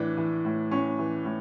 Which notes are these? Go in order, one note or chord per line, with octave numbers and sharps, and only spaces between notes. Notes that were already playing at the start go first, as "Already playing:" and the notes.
Already playing: A2 E3 D4
E3
A2
A2 C#4
E3
A2